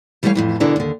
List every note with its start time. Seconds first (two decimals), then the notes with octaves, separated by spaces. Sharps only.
0.23 E3 G3 A3 B4 C#5 F5
0.35 F2 A2 E3
0.60 B2 D3 E3 D4 A#4 A#5
0.76 D#2 D3